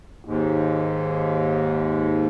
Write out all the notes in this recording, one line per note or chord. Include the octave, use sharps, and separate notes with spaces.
D#2 G#2